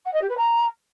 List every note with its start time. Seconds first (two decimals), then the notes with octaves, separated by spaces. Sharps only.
0.05 F#5
0.13 D#5
0.21 G4
0.29 B4
0.37 A#5